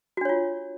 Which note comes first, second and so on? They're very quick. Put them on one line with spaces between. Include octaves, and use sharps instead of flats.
F#4 D4 C#5 F4